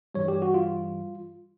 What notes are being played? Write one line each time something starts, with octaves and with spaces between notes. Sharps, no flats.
G2 E3 G3 C#5
G4
F#4
F4